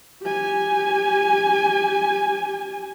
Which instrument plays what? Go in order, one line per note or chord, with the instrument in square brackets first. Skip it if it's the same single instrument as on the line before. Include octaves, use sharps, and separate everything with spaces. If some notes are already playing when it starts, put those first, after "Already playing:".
[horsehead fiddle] G4 G#5